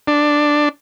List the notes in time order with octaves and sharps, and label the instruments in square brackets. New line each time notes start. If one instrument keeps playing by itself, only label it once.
[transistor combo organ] D4